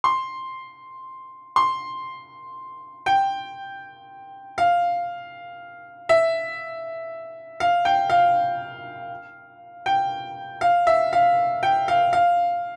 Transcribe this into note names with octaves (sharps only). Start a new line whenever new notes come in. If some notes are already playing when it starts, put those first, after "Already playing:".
C6
C6
G5
F5
E5
F5
G5
F5
G5
F5
E5
F5
G5
F5
F5